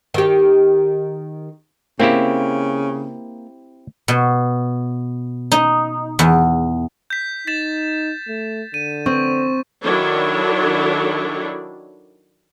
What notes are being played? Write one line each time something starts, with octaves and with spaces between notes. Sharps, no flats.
D#3 G4
C#3 A#3 C4 E4 G4
B2
D#4
E2
G6 B6
D#4 A6 B6 E7
A3
D3 D#7
C4 C#6
D#3 F#3 D4 E4 A4 C#5